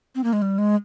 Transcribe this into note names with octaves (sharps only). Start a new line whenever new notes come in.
C4
A#3
G#3
G3
G#3